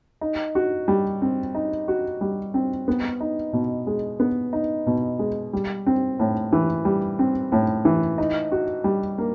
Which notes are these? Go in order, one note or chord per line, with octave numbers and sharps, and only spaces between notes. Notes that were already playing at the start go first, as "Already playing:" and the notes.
D#4
F#4
G3
C4
D#4
F#4
G3
C4
B3
D#4
B2
G#3
B3
D#4
B2
G#3
G3
C4
A2
E3
G3
C4
A2
E3
D#4
F#4
G3
A#3